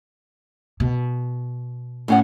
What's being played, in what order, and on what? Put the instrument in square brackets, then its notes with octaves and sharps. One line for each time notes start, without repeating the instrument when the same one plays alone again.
[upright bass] B2
[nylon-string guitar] A2 C#4 F#5